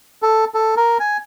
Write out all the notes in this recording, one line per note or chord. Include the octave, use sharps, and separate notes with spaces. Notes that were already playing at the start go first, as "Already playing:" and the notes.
A4
A4
A#4
G#5